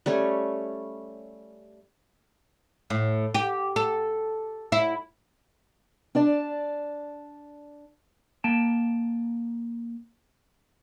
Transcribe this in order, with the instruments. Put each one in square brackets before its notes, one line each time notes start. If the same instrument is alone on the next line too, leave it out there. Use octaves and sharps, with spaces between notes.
[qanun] G3 A3 C#4 C#5
[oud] A2
G4
A4
E4
[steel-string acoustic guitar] D4 D5 A5
[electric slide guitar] A#3 G5 A5